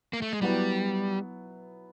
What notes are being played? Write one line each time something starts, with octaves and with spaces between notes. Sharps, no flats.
A#3
A3
G#3
F#3 G3 B3 E4